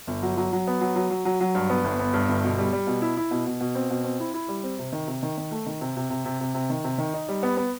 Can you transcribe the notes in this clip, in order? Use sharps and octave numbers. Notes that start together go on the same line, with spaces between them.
G1
F#3
F#3
F#3
B3
F#3
F#3
F#3
F#3
F#3
G2
B3
G1
B3
G2
G1
B2
G3
G3
B2
E4
E4
B2
B2
B2
C4
B2
C4
E4
E4
G3
C4
C3
D#3
C3
D#3
D#3
A3
D#3
C3
C3
C3
C3
C3
C3
D#3
C3
D#3
D#4
G3
B3
B3